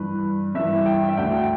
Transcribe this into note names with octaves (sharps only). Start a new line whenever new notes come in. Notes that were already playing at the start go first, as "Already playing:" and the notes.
Already playing: G2 E3 B4
G2 E3 E5
G5
E5
D2 D3 G5